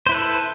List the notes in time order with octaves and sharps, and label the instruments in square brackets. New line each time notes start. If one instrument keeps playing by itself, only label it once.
[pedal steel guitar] C5
E4
B4
A4